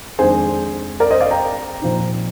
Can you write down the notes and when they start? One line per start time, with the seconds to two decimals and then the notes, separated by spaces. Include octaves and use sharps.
0.19 F2 D#3 G#3 D4 G#4 C5
1.00 A#4 D5
1.10 C5 D#5
1.21 D5 F5
1.31 G5 A#5
1.82 A#2 F3 C4 D#4